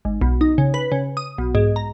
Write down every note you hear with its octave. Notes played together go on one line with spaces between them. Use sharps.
G#1
B1
D#4
C#3
B4
C#3
D#6
B1
G#2
A#5